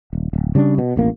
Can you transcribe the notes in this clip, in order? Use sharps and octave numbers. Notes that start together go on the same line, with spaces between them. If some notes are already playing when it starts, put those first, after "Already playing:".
D#1
D1
C#3 G3 C#4 D4
B2
E1 A1 A#3